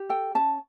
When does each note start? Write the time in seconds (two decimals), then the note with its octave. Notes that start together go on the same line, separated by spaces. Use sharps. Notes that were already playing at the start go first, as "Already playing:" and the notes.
Already playing: G4
0.09 A4 G5
0.35 C#4 A5